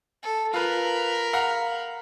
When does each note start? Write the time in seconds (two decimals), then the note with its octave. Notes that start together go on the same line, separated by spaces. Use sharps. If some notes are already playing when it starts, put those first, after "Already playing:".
0.23 A4
0.53 F4 A#4 B4 B5
1.33 F5 F#5 A#5